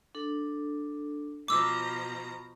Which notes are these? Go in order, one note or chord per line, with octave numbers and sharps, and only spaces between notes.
D4 A4
B2 F3 A#5 B5 C#6 D6 E6